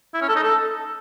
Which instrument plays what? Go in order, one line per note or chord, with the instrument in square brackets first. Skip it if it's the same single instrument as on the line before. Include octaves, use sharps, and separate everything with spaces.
[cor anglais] E4
C#4
A4
D#4
A4